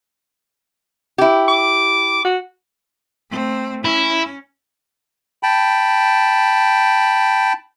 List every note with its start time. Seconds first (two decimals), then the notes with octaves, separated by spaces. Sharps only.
1.18 E4 G4
1.48 D6
2.25 F#4
3.30 A3 C4
3.85 C#4 E4
5.43 G5 A5 B5